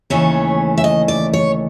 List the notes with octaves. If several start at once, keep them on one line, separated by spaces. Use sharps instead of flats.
D#2 C#3 E3 A3 C#4 C#5
E5
D#5
D5
C#5